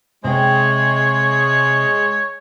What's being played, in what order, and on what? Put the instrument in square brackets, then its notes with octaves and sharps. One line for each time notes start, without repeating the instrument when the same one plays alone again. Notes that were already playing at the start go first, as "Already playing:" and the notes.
[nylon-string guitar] C3 G5 [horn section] G#3 [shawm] C#5